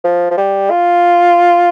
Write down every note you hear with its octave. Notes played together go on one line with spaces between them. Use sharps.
F3
F3
G3
F4